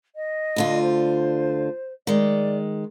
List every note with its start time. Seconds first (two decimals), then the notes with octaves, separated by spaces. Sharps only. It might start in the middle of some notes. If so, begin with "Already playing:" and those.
0.15 D#5
0.56 D2 D3 F4
0.82 C5
2.07 D#3 G#3 D5